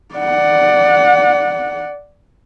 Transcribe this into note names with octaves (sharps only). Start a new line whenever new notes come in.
D5 F#5